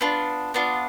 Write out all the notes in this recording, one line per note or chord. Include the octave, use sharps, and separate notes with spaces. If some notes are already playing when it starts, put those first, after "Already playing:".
B3 D4 F4
B3 D4 F4